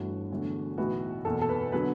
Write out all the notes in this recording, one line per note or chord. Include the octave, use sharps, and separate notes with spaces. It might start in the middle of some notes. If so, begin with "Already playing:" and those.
Already playing: G1 G2 E3 A3 F#4
E1 E2 D3 F#3 A3
B1 A2 E3 B3 F#4
F#1 E2 B2 A4
A4
B4
D3 F#3 B3 B4